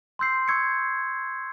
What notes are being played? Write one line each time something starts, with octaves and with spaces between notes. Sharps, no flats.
C6 E6 G6 C7
C#6 E6 G#6 C#7